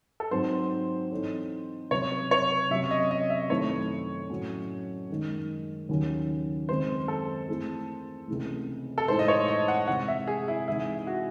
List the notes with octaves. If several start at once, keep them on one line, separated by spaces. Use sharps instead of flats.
A4
G#2 F#3 C4 C5
E3 C4 D#4 A4 C#5
C#2 C3 F#3 C#5
C#5
C3 F#3 C#4 E5
D#5
D#5
E5
F#2 D#3 A3 C4 E4 C#5
A2 F#3 A3 C#4 F#4
F#2 D#3 G#3
D#2 C#3 F#3 C#4
F#2 D#3 G#3 C4 C5
A4
E3 A3 C4 E4 G#4
C#2 C3 E3 A3
A4
A2 E3 G#3 D#4 C5
D#5
C#5
D#5
F#5
C3 E3 G#3 F#5
E5
G#4
E4
C3 E3 G#3 D#4 E4
F#4